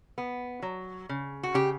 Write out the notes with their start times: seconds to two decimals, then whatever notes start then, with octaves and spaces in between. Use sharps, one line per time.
0.18 B3
0.62 F#3
1.09 C#3
1.43 F#4
1.54 C#3 G4